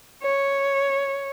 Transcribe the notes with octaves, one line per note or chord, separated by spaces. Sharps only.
C#5